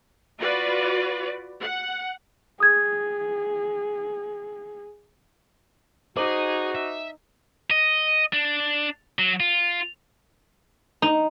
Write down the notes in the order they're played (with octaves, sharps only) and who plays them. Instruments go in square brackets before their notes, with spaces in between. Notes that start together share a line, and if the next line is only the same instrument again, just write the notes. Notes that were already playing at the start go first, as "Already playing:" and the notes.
[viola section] F4 F#4 B4 D5
F#5
[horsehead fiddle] G#4 [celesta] D#6 G#6
[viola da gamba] D#4 [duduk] F#4 [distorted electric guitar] G#4 [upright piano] C5 D6 F#7
[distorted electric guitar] E5
D#5
D4
F#3
F4
[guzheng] D#4